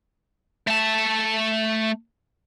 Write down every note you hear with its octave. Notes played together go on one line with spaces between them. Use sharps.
A3 A5